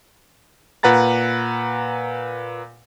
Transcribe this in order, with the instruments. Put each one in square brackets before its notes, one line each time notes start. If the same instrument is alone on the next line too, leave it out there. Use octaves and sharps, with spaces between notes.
[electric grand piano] A#2 B4 F#5 A#5 A6